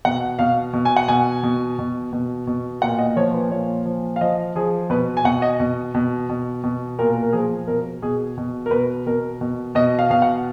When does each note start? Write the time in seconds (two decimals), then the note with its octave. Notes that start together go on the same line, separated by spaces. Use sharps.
0.05 B2 F#5
0.39 B2 F5
0.73 B2
0.85 G#5
0.96 F#5
1.08 B2 G#5
1.43 B2
1.79 B2
2.13 B2
2.47 B2
2.82 A#2 F#5
2.99 D#5
3.16 F3 C#5
3.34 B4
3.51 A#2 C#5
3.85 F3
4.16 F5
4.21 F3 D#5
4.55 F3 G#4
4.90 B2 B4
5.17 G#5
5.24 B2 F#5
5.42 D#5
5.60 B2
5.94 B2
6.29 B2
6.64 B2
6.99 A#2 A#4
7.23 A#4
7.33 F3 G#4
7.67 B2 A#4
8.02 B2 G#4
8.37 B2
8.66 A#4
8.71 B2 B4
9.06 B2 A#4
9.41 B2
9.75 B2 D#5
9.99 F5
10.10 B2 F5
10.22 F#5